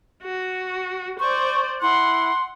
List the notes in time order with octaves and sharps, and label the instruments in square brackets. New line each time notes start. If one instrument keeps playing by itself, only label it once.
[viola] F#4
[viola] C5 D5 [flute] C#6
[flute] E4 [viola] F#5 [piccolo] C6